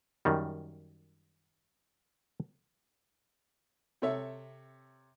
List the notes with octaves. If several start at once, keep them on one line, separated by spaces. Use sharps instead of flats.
F#2 D#3 G3
C3 A4 C#5 E5